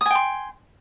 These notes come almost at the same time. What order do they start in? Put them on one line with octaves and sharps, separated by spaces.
D#6 G#5 G5 C6